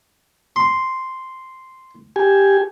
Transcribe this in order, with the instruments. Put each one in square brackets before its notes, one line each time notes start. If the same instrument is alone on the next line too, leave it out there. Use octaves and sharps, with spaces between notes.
[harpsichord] C6
[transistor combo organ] G4 G#5